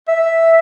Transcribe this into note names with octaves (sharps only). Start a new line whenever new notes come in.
E5